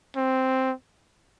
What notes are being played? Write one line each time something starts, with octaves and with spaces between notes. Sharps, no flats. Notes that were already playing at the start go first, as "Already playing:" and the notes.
C4